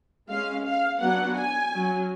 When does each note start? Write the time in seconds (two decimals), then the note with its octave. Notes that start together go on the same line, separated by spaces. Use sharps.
0.28 G#3 C#4 F5
0.64 F5
1.00 F#3 B3 D4 F#5
1.37 G#5
1.73 F#3 C#4